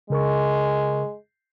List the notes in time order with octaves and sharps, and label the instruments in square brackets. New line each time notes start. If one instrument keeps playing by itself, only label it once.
[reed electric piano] C#3 A#4 C#6 [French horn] G#3